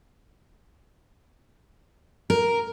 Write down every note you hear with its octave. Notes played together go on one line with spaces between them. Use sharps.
A#4